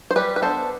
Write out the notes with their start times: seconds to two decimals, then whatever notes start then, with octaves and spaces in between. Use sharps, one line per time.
0.11 C5
0.16 G3 G4 B4
0.36 B4
0.42 B3 D4 A4 C5